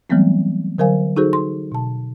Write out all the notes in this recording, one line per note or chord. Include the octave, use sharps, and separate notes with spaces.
E3 F#3 G3 A3 B3 C4
D3 F#3 A#4 C5 F5 G#5
D#4 F#4 G#4 A4 C5
C6
B2 A5